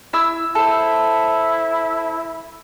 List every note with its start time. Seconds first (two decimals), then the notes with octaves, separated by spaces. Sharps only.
0.13 E4 E5 E6
0.55 E4 A4 C5